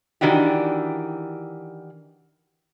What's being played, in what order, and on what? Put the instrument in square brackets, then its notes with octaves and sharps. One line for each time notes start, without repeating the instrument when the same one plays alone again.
[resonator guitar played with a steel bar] D#3 E3 D4 F#4 G4